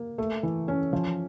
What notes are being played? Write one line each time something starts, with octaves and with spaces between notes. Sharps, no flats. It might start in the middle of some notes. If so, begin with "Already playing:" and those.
Already playing: A#3
A3
E3
C#4
F3